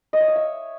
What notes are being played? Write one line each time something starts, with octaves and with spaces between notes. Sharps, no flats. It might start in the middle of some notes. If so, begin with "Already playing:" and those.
D#5
C#5
F5
E5